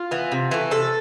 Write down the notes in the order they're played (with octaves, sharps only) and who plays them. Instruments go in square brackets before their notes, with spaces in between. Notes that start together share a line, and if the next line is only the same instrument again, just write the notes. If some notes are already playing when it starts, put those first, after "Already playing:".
Already playing: [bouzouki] F4
E3 B3
C3
E3 A3
C3 A4